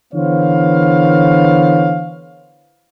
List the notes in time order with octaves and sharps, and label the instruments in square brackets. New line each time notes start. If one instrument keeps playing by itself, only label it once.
[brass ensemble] D3 E3 B3 C5 C#5 F5